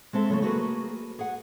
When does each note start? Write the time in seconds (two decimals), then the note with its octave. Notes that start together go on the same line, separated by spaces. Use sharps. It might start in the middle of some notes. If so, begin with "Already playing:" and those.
0.13 G#3 C4 A4 E5
0.30 C#3 E3 F#3 A3
0.42 A3 A#3 F#4 G#4 B4
1.19 G#4 F#5